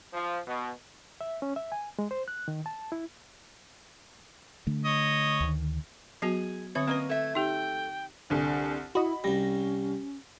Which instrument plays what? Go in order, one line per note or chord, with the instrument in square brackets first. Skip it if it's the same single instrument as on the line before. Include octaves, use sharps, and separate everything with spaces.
[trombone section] F3
B2
[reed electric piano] E5
C#4
E5
G#5
G#3
C5
F#6
D#3
A5
E4
[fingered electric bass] D3 A3
[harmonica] C#5 D#5
[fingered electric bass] D2 D#3
[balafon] F#3 B3 F#4 [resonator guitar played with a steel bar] G#4
[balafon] D3 C4 E5 [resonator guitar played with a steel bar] C#5 [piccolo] D#6
[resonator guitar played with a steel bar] A#3 C#4 D#5 [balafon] C4 B4
[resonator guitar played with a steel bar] A3 E5 [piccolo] G#6
[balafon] D#4 G4 [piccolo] G5
[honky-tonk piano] C2 D3 [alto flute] G#5
[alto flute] E4 [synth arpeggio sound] F#4 D#5 [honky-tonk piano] B5
[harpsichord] C2 G3 [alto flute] C#4 [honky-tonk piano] A#6